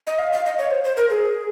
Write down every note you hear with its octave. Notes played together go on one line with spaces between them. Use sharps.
D#5
F5
F5
D#5
C#5
C5
C5
A#4
G#4